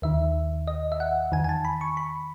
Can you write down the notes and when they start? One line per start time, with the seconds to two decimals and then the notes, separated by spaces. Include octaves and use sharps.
0.02 D#2 D#3 E5
0.67 D#5
0.92 E5
1.00 F#5
1.32 E2 D#3 G#5
1.44 G#5
1.49 A5
1.65 B5
1.81 C#6
1.97 B5